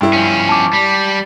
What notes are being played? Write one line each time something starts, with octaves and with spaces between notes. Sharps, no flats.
G2 E4
F3 C#4
A5 D6
G3